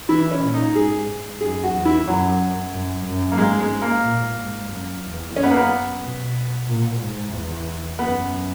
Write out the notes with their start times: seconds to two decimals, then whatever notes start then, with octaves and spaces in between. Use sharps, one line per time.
0.09 E3 E4
0.31 C#4
0.42 A#2
0.54 D#4
0.75 G#2 G#4
1.08 G#2
1.41 F#2 G#4
1.63 F#4
1.74 E2
1.85 E4
2.07 F#2 F#3
2.73 F#2
3.06 F#2
3.32 A#3
3.38 G#2 G#3
3.60 G#3
3.82 A#3
4.04 A#2
4.37 G#2
4.70 F#2
5.03 E2
5.36 F#2 C#4
5.43 B3
5.51 A#3
5.57 B3
6.02 B2
6.67 A#2
7.01 G#2
7.34 E2
7.99 F#2 B3